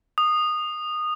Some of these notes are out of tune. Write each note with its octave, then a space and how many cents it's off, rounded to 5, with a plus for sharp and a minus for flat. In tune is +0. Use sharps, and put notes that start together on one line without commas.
D#6 -20